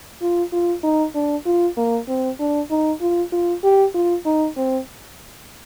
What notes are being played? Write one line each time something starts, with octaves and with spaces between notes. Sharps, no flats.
F4
F4
D#4
D4
F4
A#3
C4
D4
D#4
F4
F4
G4
F4
D#4
C4